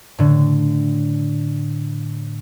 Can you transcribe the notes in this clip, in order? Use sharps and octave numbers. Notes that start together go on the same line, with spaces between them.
A2 D3